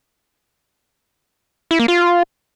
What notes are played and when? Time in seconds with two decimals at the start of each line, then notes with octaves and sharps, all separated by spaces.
1.71 E4
1.79 A#3
1.88 F4